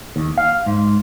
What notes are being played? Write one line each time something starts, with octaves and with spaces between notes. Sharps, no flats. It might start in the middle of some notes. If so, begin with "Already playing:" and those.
D#2
F5
G#2